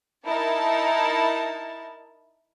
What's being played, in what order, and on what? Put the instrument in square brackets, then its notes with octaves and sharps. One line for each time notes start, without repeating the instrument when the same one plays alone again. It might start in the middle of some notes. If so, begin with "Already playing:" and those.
[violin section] D#4 E4 A#4 A5